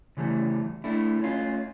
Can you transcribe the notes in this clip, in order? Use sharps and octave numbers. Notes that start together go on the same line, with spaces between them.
C#3 E3 G3 A3
A3 D4 E4
A3 C#4 F4